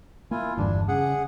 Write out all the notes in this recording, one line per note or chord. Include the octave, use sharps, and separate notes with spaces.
A#3 E4 F4 G#5
G1 E2 G2 D4
C#3 G#4 F#5